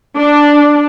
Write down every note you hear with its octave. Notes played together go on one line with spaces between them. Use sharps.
D4